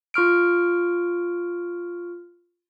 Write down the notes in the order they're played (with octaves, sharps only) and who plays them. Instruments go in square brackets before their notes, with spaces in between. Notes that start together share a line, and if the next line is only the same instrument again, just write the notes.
[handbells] F4 C#6 F6 D7